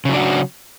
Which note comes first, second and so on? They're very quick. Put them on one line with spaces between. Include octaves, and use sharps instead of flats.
C#3 F#3 D4 F#4